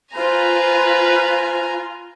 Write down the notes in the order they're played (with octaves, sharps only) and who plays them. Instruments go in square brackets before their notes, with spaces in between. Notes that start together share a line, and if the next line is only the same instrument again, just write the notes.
[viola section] F4 [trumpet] B4 [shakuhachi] C5 [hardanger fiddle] G#5 A#5